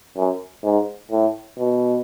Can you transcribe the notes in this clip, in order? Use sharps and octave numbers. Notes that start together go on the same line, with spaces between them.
F#2
G#2
A2
B2